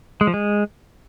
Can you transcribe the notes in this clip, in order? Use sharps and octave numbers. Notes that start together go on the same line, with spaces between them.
G#3
F3
G#3